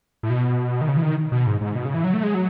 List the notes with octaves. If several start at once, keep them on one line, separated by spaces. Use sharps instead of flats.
A2
B2
D#3
C#3
E3
D#3
B2
G#2
G#2
B2
C#3
E3
F#3
A3
G#3
F#3